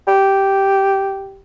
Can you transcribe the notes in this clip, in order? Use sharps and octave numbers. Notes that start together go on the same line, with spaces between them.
G4